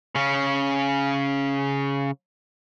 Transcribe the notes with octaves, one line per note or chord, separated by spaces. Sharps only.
C#3 C#4